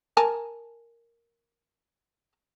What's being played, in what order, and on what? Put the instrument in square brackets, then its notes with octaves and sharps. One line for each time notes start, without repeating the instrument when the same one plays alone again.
[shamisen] A#4 G#5 A5